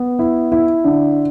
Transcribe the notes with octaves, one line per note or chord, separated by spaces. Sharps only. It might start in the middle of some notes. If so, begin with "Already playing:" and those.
Already playing: B3
E4
E4
D3